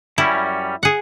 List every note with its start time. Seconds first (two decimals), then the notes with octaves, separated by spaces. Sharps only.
0.18 F#2 G3 C#4 E4
0.83 G#4 F#5